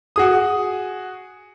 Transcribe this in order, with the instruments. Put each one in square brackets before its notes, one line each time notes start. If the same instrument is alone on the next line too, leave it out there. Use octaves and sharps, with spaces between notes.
[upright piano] F#4 G#4 D#6